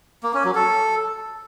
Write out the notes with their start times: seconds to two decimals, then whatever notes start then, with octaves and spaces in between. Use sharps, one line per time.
0.23 A#3
0.34 C#4
0.44 F#3
0.55 A4